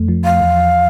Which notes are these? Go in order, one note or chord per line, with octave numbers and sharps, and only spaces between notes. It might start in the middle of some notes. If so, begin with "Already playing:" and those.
Already playing: F2 A3
F3
F5
E2